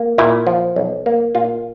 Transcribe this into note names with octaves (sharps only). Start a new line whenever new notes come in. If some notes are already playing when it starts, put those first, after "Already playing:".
Already playing: A#3
A#2 E4
F3
B1
A#3
A#2 F4